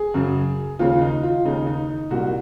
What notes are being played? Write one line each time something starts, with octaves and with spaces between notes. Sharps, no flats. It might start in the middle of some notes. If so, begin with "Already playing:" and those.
Already playing: G#4
F#2 C#3
D#2 C#3 F4
D#4
F4
D#2 C#3 D#4
D#4
D#4
C2 A#2 F#4